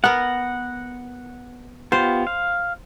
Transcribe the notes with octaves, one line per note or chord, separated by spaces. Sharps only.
B3 A#4 F#5
B3 F4 G4 C5
F5